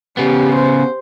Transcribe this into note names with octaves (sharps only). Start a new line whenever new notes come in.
C#3 B3 G4
C5